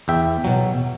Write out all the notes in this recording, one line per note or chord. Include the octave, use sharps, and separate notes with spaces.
E2 E5 G5
B2 F#3